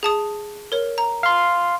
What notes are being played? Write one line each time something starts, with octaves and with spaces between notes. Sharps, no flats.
G#4 A5 D#6
A#4 C#5
A#5
F5 C6